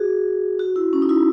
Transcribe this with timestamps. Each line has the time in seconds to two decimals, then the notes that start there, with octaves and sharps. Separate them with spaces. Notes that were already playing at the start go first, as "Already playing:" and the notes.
Already playing: F#4 G#4
0.59 F#4
0.76 E4
0.93 C#4
1.02 D#4
1.09 E4